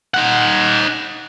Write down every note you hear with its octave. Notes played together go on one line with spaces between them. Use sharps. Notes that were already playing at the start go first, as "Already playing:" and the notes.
D#4 F#5